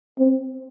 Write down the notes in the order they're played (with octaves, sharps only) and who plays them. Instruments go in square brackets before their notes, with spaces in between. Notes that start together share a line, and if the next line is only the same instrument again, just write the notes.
[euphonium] C4